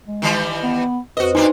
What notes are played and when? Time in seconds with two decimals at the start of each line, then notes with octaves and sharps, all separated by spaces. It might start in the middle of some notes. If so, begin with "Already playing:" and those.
0.07 G#3
0.22 D#3 E3 G3
0.63 B3
1.17 F2 F#4 B4 C5 D#5
1.35 G2 A#3 D4 D#4 G#5 C6